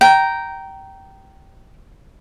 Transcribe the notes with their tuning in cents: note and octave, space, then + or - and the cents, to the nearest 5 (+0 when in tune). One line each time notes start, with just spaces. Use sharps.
G5 -15 A#5 +0